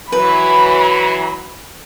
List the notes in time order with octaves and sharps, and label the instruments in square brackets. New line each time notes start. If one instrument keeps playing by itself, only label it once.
[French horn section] E3 F#3 [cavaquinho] B4 [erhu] B5